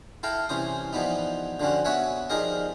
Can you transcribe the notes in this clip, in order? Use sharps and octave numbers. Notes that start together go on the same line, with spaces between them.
E4 A4 F5 G5 A#5
C2 E3 C#4 C5 D#6
E3 F3 G3 B3 D#4
D3 F3 G3 C#4 F#4
B3 F#4 C#5 E5 F#5 G#5
F3 G3 D#4 G#4 A#4 D#5